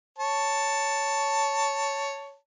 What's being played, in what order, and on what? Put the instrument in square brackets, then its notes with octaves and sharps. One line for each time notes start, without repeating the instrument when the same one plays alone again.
[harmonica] C#5 A5